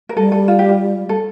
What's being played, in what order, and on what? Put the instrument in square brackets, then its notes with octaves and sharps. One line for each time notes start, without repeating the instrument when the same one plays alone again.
[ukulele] A#4
[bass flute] G3 [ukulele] A4
[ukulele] A4
F4
G4
F4
A4